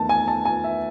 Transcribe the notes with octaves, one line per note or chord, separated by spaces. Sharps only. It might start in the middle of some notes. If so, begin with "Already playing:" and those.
Already playing: E2 D#3 A3 A5
G#5
A5
G#5
E5